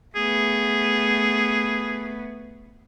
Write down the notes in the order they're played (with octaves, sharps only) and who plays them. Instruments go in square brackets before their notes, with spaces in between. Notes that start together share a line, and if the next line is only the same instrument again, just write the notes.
[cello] A3 B3 [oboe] G#4